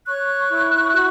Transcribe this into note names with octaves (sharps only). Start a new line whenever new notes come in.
C#5 C#6 F#6
E4
F#4